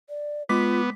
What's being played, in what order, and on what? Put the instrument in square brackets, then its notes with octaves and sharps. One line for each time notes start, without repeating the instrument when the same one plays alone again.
[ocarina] D5
[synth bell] G#3 D6 B6 [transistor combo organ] B3 [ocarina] F4